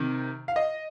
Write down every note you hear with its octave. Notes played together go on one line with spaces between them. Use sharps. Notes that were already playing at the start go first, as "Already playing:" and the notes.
Already playing: C3 D#3
F5
D#5